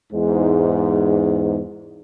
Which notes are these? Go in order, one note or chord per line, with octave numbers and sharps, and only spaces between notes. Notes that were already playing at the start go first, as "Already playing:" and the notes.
E2 G#2